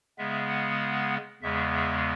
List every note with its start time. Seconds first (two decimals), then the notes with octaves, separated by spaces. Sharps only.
0.18 C#3 G#3 B3 E5
0.50 F#5
1.42 E2 C#3 G#3 B3 E5
1.73 E5